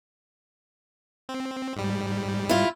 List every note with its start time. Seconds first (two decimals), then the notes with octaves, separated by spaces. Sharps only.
1.29 C4
1.76 G#2 G3
2.49 E4 F4